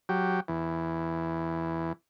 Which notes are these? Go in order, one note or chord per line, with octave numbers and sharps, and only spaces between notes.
F#3 G4
E2